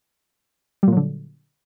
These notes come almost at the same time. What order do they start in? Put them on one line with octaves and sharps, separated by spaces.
G3 A#2 F#3 D3